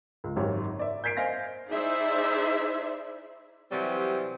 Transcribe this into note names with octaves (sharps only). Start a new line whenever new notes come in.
C#2
G#1 F#2 G4 C#5
D5 E5
G6 G#6 B6 C7 D7
C5 D#5 F5 G#5 A#6
D#4 E4 G#4 C5 D5 E5
C3 E3 F#3 G3 C4